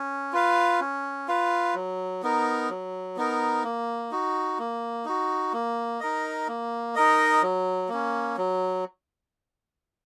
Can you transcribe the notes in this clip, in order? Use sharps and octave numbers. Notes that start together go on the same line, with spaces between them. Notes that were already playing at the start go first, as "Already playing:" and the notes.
Already playing: C#4
F4 B4 F5
C#4
F4 B4 F5
F#3
B3 D#4 A#4
F#3
B3 D#4 A#4
A#3
D#4 F#4
A#3
D#4 F#4
A#3
D#4 A#4 D#5
A#3
D#4 A#4 D#5
F#3
A#3 C#4
F#3